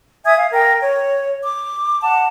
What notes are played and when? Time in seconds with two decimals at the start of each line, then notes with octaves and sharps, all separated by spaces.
0.24 E5 G#5 D#6 G#6
0.37 F5
0.52 A#4 G5
0.81 C#5
1.42 D6
2.02 F#5 A5